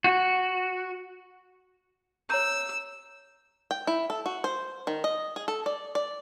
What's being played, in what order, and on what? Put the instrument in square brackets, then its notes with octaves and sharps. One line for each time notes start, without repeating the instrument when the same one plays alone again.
[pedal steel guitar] F#4
[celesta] C#5 A#5 G6 [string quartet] E6
[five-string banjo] G5
E4
A4
F#4
C5
D#3
D#5
G#4
A4
D5
D5